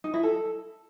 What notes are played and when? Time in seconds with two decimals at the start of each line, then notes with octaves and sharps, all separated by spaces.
0.04 D#4
0.14 E4
0.23 A4